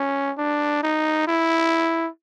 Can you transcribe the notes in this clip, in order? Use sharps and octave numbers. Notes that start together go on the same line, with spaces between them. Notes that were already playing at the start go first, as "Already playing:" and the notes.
Already playing: C#4
D4
D#4
E4